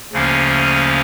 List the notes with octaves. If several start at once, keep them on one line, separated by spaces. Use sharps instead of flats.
D2 C#3 F3 A#3 C#4